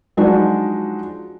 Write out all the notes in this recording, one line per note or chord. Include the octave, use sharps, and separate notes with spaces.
F3 F#3 G#3 D4 D#4 F#4